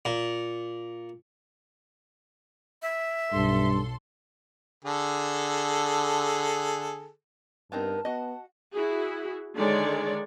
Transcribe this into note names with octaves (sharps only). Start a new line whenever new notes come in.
A#2
E5
B1 G2 A4 C6
D3 G#4 A4
G2 B3 C4 D#4 A#4 A5
B3 F#4 D#5 F#5
E4 F#4 G#4
D3 D#3 G#3 C#5 D5